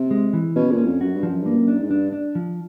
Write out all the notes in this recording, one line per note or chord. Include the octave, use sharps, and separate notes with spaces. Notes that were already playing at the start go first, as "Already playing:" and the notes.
Already playing: C3
G#3
E3
B2 C#4
A#2
C#4
F2
F#2 F#4
G2
F3
F#2
G2 A#3
F#2
D4
G#2
G2 D4
D4
F3